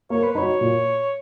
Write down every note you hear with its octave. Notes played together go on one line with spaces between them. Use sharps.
A#3 C#5
B4
D#4 F#4 C#5
A#2